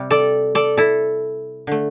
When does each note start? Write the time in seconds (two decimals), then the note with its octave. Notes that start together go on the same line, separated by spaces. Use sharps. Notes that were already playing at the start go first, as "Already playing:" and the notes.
Already playing: C3 G3
0.11 A4 D5
0.55 A4 D5
0.77 E4 A4
1.67 D3 A3